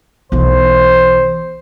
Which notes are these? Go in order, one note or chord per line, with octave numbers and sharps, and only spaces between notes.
B1 E3 C5